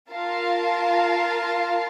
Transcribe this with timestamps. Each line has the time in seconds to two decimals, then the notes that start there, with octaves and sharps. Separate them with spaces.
0.11 F4 A#4 F5 A5